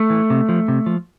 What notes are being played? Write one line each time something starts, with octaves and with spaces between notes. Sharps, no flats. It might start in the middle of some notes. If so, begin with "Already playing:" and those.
Already playing: A3
E3
C3
F3
C3
F3